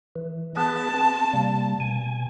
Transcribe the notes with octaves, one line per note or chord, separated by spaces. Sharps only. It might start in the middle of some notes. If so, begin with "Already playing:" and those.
E3
B3 G#4 B4 A5
C4
C3 G3 A#3
B2 G#5